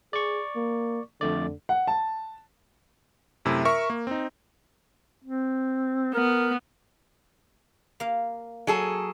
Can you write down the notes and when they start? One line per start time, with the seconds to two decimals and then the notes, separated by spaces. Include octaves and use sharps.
0.13 G#4 D5 C#6
0.56 A#3
1.21 F2 D3 A3 D5
1.69 F#5
1.88 A5
3.45 F#2 C3 A3 E4
3.65 A#4 E5 C#6
3.90 A#3
4.07 C4 D#4
5.24 C4
6.14 B3 A#4
8.00 A#3 F5
8.67 F#3 G#4 A4